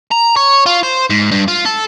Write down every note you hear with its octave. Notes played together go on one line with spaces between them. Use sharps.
A#5
C#5
F4
C5
G#2
G2
F4
A4